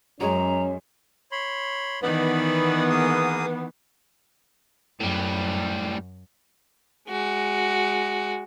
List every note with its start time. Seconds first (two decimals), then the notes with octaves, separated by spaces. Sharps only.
0.20 F#2 F#3 G#3 C#4 C#5 A#5
1.32 C#5 B5 C6
2.03 D#3 E3 B3 D#4 D5 B5
2.90 A#3 G#4 D#6
5.00 F#2 A2 G3
7.08 G#3 F#4